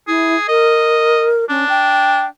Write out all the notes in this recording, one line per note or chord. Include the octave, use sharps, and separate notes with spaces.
E4 G#4
A#4 D#5
C#4 D4
G5